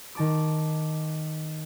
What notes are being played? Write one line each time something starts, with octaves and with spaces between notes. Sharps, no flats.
D#3 A5 D6